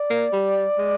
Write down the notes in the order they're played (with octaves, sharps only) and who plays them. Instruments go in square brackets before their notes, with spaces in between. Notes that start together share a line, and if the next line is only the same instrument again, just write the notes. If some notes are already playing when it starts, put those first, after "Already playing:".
Already playing: [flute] D5
[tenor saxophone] A#3
G3
G#3